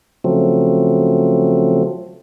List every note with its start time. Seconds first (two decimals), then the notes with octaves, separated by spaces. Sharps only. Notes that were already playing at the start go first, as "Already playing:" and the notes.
0.24 C#3 F3 F#3 A3 C4